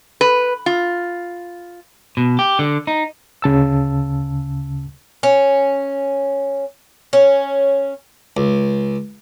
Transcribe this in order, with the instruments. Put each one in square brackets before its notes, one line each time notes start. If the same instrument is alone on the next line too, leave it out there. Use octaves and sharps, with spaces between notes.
[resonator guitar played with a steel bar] B4
F4
[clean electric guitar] B2
G4
D3
D#4
[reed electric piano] D2 C#3 A5 E6
[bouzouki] C#4
C#4
[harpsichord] C#2